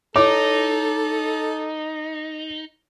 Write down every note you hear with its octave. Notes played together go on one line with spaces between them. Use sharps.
D#4 E4 A4 C#5 D6